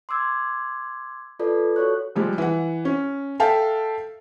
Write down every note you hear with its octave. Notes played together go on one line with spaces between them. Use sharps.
C6 D6 E6 G#6
F4 A4 B4 D5
F#4 A4 C#5 C#6 F#6
F3 G3 G#3
E3 F#5
C#4
A4 E5 F5 G5 A5